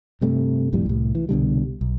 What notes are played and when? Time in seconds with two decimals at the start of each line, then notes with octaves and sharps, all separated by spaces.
0.21 G2 C3 A3
0.73 D1 F2 A2 G3
0.86 C2 A2
1.15 E3
1.29 C2 B2 D3 G3
1.81 B1